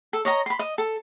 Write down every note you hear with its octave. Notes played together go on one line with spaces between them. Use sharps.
A4
C#5 D#5 A#5
B5 C6
D#5
A4